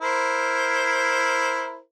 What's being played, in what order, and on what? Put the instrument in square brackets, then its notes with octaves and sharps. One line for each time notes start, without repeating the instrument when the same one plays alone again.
[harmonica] E4 A#4 C5